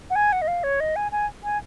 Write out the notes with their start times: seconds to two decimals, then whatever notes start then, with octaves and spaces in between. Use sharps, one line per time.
0.10 F#5
0.16 G#5
0.33 F#5
0.42 D#5
0.48 F5
0.64 C#5
0.80 D#5
0.96 G#5
1.12 G#5
1.44 G#5